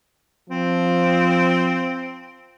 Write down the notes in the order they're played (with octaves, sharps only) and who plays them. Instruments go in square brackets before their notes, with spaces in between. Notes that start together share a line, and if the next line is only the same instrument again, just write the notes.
[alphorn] F3 [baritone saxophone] C4